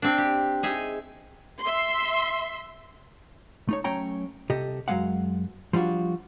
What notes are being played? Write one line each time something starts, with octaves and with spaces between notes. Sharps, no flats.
C4 D4
G4
D#4 G#4 E5
E5 C6
A3 D#4 C#5
F#3 A3 C#4 C#5 G5 A#5
C2 C3 G4 A4 D#5
F#2 A#2 F#3 G#3 F5 F#5
F3 G3 D4 F4 F#4